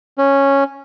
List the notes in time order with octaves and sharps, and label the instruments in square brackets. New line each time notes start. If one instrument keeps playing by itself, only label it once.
[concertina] C#4